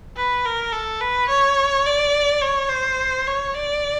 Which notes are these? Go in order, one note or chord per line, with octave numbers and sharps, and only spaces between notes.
B4
A#4
A4
B4
C#5
D5
C#5
C5
C#5
D5